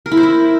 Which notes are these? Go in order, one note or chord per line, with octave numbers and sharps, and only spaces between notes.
A#4
E4
C5
E4